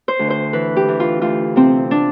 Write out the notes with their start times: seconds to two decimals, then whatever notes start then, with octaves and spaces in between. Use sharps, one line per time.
0.08 C5
0.19 D2
0.30 C5
0.53 E3 B4
0.76 G4
0.88 E3
1.00 F4
1.22 D2 F4
1.56 C3 C4
1.91 D4